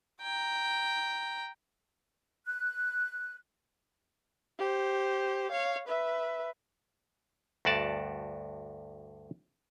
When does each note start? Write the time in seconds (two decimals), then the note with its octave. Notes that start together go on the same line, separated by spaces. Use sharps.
0.22 G5 A#5
2.46 F#6
4.59 G4 C5
5.51 C#5 F5
5.88 B4 E5
7.65 D2 G2 F#4 D5 A5